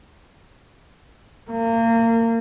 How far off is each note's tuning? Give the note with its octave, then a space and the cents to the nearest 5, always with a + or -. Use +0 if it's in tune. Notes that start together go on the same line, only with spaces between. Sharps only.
A#3 -30